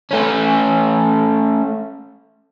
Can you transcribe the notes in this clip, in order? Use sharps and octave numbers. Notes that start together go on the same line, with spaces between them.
A3 C#4